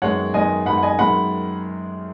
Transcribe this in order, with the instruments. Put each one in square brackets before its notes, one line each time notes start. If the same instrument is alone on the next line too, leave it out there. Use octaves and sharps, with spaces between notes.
[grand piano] F#2 D#3 G#3 B3 [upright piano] C#5 F#5
[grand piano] F#2 D#3 G#3 B3 [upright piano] D#5 G#5
[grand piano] F#2 D#3 G#3 B3 [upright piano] F#5 B5
[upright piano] F#5
D#5 G#5
[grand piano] F#2 D#3 G#3 B3 [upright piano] F#5 B5